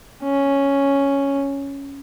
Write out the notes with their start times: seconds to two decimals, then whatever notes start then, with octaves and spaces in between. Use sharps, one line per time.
0.24 C#4